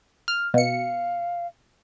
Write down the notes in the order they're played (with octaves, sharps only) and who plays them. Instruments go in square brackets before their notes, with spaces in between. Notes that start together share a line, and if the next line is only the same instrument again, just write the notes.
[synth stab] F6
[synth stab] B2 C#7 [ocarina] F5